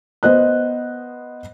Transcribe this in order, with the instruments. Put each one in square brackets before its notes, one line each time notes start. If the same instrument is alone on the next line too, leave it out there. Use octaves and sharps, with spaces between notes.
[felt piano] B3 C5 D#5 F#6